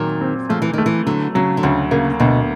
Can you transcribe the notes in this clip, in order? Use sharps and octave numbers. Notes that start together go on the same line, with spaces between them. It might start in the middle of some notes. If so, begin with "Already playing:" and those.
Already playing: A#2 D#3 F#3 C4
C4
F3 A3
E3
D#3 A3
E3
D3 F#3
C#3 F#3
D3
D2 C#3
C#3 A#3
D2 B2